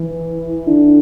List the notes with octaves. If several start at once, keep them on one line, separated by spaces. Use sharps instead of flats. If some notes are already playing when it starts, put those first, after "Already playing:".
Already playing: E3
D3